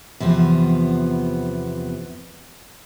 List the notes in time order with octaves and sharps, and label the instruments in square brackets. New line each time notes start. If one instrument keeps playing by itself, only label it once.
[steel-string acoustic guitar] E2 C3 F3 B3